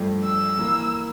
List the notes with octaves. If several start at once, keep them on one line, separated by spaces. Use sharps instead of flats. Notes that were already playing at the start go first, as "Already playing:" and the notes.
Already playing: G2 F3 A3
E6
E3 A#3